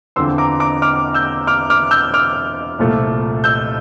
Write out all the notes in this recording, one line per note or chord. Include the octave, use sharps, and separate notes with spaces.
E2 D3 F3 C4 C6 E6
A#5 D6
A#5 D6
D6 F6
E6 G6
D6 F6
D6 F6
E6 G6
D6 F6
C2 A#2 F3 A3
E6 G6